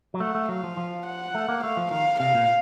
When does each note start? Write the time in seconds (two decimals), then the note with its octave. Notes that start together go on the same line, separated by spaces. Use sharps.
0.14 F#3
0.20 A3 F#5
0.35 A3
0.49 F#3 F5
0.64 F3
0.77 F3
1.06 F#5
1.35 A3
1.49 A#3
1.63 A3 F5
1.77 F3
1.91 D#3 F5
2.20 C3 F5
2.34 A#2